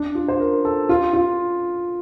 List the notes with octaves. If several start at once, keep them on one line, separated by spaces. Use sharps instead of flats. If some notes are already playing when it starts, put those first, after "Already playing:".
Already playing: D4
F4
C5
A#4
A4
F4
F4